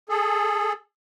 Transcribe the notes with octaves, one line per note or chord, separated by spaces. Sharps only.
G#4 A4